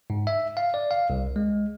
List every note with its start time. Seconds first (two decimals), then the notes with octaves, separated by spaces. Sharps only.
0.10 G#2
0.27 E5
0.57 F5
0.74 D5
0.91 F5
1.10 C2
1.36 G#3